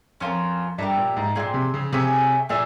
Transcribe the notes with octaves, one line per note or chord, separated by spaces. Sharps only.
F2 C#4 F4 A#4
G2 G4 A#4 E5
A#2
G#2
A#2 C4 F4 G#4
C3
C#3
C3 G#4 C#5 E5 G#5
A#2 G#4 E5